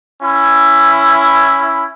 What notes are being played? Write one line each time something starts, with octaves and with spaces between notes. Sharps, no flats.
C#4 E4